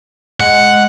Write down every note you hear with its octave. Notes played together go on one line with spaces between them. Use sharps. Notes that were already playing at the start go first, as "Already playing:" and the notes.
G#3 F#5